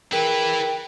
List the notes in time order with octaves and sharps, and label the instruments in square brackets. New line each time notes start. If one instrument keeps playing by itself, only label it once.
[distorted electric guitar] E4 B4 [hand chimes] G#4 A#4 [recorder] G5